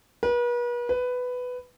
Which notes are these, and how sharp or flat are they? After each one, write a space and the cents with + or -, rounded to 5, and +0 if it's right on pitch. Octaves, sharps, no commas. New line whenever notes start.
B4 -40
B4 +10